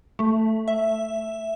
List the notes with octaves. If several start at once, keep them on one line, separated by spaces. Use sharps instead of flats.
A3
E5